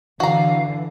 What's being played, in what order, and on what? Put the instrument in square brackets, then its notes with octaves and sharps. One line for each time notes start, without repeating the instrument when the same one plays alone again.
[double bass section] D3 [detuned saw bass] E3 [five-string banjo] F#4 A#5 [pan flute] F5